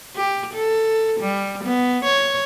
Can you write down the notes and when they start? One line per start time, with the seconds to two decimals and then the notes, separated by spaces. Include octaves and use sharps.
0.16 G4
0.54 A4
1.20 G3
1.64 B3
2.05 C#5